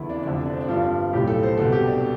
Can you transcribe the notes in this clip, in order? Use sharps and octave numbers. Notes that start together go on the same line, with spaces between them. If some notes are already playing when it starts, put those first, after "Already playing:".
Already playing: E2 D3 E4
D4
F1 F2 D3 D4
D4
C4
D4
G1 G2 F3 F4
B1 A2 F3 G4
A4
C5
C2 B2 A4
G4
D4